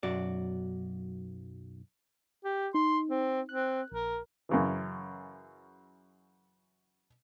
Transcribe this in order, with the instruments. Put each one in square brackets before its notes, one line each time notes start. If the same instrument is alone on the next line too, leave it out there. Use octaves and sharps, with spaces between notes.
[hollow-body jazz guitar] B1 F#2 F#4 D5
[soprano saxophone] G4
[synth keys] D#4 [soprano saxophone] C6
[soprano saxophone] C4
[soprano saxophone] C4 [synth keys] F#6
[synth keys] A#1 [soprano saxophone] A#4
[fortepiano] F#2 C#3 E3